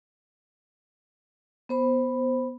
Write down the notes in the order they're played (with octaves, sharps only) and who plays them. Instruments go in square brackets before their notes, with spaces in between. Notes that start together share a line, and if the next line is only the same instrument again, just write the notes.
[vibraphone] B3 C5 B5